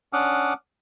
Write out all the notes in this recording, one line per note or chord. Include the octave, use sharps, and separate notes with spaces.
C#4 D4 F#5 D6 D#6 F6